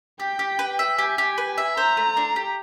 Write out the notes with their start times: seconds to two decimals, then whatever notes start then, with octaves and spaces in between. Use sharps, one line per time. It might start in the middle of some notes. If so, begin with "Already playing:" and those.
0.20 G4 G5
0.39 G4
0.59 B4
0.79 E5
0.98 G4 G#5
1.18 G4
1.38 B4
1.58 E5
1.77 C5 A#5
1.97 A3
2.17 D4
2.36 G4